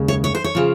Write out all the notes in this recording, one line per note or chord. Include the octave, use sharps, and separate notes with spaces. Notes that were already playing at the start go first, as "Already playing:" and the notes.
Already playing: D#2 C#3 G#3
C#5
C#5
C5
C#5
C#3 F3